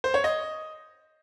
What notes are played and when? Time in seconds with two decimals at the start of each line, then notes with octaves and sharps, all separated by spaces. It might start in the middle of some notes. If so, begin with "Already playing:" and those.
0.04 C5
0.14 C#5
0.24 D#5